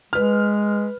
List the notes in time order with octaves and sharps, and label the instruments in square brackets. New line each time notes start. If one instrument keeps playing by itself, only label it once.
[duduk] G#3 [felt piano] B4 F6